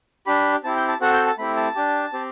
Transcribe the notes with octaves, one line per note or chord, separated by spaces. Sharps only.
D4 G4 B5
C4 E4 G4 A5
G5
A5
C4 F#4 A4 F#5
G5
A5
A3 C4 E4 G4 B5
A5
D4 G4
C4 G4